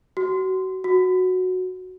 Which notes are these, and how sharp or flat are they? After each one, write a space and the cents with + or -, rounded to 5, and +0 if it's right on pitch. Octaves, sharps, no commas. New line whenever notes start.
F#4 +30
F#4 -5